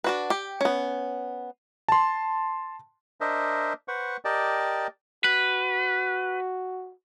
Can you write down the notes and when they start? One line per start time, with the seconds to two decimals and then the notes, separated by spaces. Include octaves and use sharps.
0.04 D4 F#4 B4
0.30 G4
0.61 B3 C#4
1.88 A5 C6
3.21 D4 A#4 C5 D#5 E5
3.88 B4 C5 F#5 C#6
4.25 G4 A#4 D5 D#5 G5 A5
5.24 F#4 B4